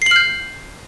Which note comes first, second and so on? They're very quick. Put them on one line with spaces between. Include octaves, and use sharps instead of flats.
C7 F#7 F6 G6